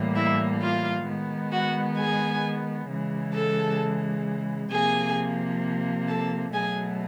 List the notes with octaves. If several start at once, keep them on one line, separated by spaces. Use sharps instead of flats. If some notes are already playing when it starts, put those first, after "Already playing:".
Already playing: A2 E3 G3 A#3
E4 E5
F4 F5
D#3 G#3 B3
F#4 F#5
G#4 G#5
C#3 E3 G#3
A4 A5
C3 F3 A#3 G#4 G#5
A4 A5
B2 F#3 A3 G#4 G#5